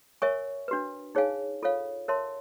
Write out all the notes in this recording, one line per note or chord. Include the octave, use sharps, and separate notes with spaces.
A#4 C#5 E5 G#5 C#6
D4 F#4 B4
D#4 G#4 C#5 F5 G#5
F4 A4 C#5 F5
A#4 C#5 E5 A5 C6